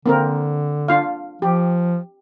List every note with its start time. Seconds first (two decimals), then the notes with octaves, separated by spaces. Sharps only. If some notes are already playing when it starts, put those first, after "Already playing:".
0.06 D3 A#3 C4 A#4
0.88 D4 F4 F5
1.42 F3 G4